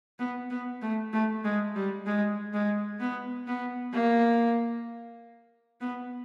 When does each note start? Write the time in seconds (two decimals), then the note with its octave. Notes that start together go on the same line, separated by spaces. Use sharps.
0.19 B3
0.50 B3
0.82 A3
1.13 A3
1.44 G#3
1.75 G3
2.06 G#3
2.53 G#3
3.00 B3
3.47 B3
3.93 A#3
5.81 B3